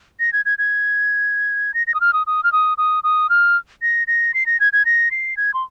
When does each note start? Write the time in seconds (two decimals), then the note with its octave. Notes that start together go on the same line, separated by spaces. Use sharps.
0.20 A#6
0.33 G#6
0.45 G#6
0.58 G#6
1.74 A#6
1.87 A#6
1.94 D#6
2.01 F6
2.13 D#6
2.27 D#6
2.44 F6
2.52 D#6
2.78 D#6
3.04 D#6
3.30 F6
3.82 A#6
4.07 A#6
4.34 C7
4.46 A#6
4.60 G#6
4.73 G#6
4.85 A#6
5.11 C7
5.37 G#6
5.54 C6